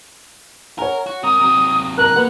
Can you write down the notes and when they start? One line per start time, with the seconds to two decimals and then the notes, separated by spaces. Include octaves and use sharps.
0.79 A#4 C#5 F#5 G#5
1.07 F#4
1.23 C3 A#4 D#6
1.39 C3 F#3
1.98 A#4 A#5 F#6
2.16 F#3 A#3 B4 F#5